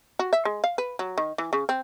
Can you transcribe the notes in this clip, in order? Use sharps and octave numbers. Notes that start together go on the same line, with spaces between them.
F#4
E5
G#3
F5
B4
F#3
D#3
E3
C#3
C4